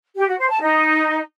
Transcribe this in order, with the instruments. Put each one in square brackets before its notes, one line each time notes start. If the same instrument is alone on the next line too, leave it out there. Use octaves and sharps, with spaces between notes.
[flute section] G4
F#4
C5
A5
D#4